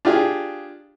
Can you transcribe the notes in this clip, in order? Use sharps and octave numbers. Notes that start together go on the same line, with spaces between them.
D4 F4 G4 G#4